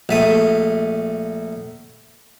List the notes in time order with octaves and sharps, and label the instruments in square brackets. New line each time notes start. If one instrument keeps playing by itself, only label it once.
[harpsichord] A#1 A3 D#6